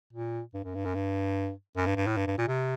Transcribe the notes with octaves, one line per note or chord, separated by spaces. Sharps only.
A#2
G2
F#2
G2
F#2
G2
F#2
G2
G2
A2
G2
G2
A#2
C3